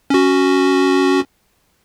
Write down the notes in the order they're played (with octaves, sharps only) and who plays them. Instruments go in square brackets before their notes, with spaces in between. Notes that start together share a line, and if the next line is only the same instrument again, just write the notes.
[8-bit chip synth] C#4 F#4